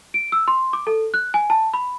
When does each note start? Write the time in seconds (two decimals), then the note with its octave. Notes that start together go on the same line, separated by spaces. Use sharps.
0.14 D7
0.32 E6
0.48 C6
0.73 D6
0.87 A4
1.14 F#6
1.34 G#5
1.50 A5
1.74 B5